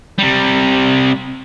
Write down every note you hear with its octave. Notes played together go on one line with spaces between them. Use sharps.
C3 G3